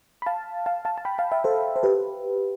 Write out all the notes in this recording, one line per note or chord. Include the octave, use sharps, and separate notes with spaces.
B5
F5 A5
F5 A5
F5 A5
A5
G5 B5
F5 A5
E5 G5
A4 C5
C5
G4 B4